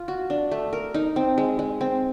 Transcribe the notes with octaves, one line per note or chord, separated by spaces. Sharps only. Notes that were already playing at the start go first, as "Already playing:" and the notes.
Already playing: F4
F#4
D4
A3
A#4
D#4
C4
G#3
G#3
C4